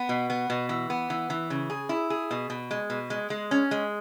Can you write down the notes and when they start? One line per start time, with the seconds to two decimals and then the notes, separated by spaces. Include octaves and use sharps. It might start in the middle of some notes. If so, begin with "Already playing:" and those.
Already playing: B3
0.09 B2
0.30 B3
0.50 B2
0.69 E3
0.90 B3
1.10 E3
1.30 E3
1.50 C#3
1.70 G#4
1.89 E4
2.10 G#4
2.31 B2
2.50 B2
2.71 G#3
2.90 B2
3.10 G#3
3.30 G#3
3.51 C#4
3.71 G#3